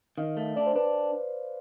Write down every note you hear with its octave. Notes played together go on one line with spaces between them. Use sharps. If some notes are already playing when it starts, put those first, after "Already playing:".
D#3 F5
A3
D4 D5
C5
D4 B4